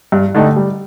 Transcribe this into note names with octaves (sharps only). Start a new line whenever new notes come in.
G2
D3 A3 D#4 G4
G3